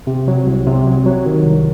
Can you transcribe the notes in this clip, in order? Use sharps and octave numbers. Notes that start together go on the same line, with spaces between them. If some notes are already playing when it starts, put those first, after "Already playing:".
C3
F#3
C2
C3
F#3
F#3
D#3
C2